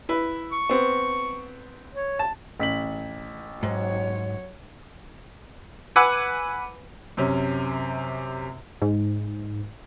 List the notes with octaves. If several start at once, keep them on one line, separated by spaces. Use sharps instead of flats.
E4 B4
C#6
B3 C4
C#5
A5
A1 B6 F#7
G#2 F#3 C#5
B4 F#5 G#5 B5 D6 E6
F#2 C3 C#4
G#2